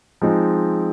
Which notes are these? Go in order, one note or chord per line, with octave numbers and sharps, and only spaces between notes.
F3 G#3 C4 D#4